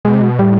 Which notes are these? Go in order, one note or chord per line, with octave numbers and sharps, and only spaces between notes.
B2 G#3
C3
B2
A2 G3